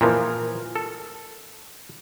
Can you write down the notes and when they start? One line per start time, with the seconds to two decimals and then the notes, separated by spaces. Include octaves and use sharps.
0.01 A#2 E3 F3 A#4
0.76 A4